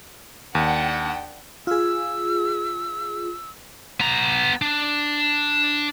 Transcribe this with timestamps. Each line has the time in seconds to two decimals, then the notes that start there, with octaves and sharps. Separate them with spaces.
0.55 D#2 D4 F#5 G5
1.67 F4 G#4 E6
4.00 B3 A#5
4.62 D4